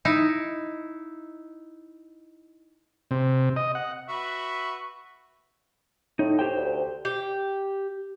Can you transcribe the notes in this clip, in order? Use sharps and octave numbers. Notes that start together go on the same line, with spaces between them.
D#4 E4
C3
D#5
F#5
F#4 B4 E5
A2 D#4
G4 C5 G5
D2
G4